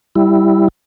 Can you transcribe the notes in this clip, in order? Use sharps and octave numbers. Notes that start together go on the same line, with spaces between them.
G3 E4